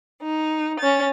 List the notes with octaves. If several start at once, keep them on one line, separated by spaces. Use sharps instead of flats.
D#4
C#4 A6